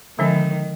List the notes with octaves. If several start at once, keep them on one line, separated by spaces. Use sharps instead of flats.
D3 D#3 F3 G#3 C4 D#4